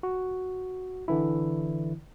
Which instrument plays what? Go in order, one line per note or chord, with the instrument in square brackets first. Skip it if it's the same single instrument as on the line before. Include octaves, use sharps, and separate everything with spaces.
[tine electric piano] F#4
D3 E3 E4